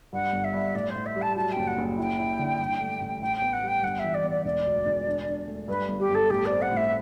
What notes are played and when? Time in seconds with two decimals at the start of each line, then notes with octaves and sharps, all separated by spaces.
0.13 G2 F#5
0.33 G1
0.44 E5
0.53 G2
0.74 A2 D5
0.89 C5
0.96 A2
1.05 E5
1.16 G3
1.21 A5
1.36 F#3 A5
1.51 G5
1.57 F#1
1.67 F#5
1.78 F#1
1.98 E4 G5
2.19 E4
2.39 D3
2.59 G2
2.80 A3
3.01 A1
3.21 A2 G5
3.36 G5
3.42 B3
3.52 F#5
3.63 G3 G5
3.83 G1 F#5
3.99 E5
4.04 E3
4.14 D5
4.24 B3
4.30 D5
4.44 E1 D5
4.66 D2
4.86 E1
5.07 D4
5.27 D4
5.47 A3
5.68 G2 B4
5.88 G1
5.99 G4
6.09 G1 A4
6.30 A2 G4
6.45 D5
6.51 C4
6.61 F#5
6.71 A2 E5